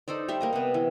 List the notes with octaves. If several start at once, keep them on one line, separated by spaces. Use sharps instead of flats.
D#4 A4 C5 D5
G3 E5 C6
A#3 A#4 D#5
C3 B3
E3